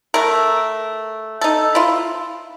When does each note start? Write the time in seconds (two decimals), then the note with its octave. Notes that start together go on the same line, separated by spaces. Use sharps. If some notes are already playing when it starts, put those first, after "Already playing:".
0.14 A3 A#4
1.41 D#4 A4
1.75 E4 F4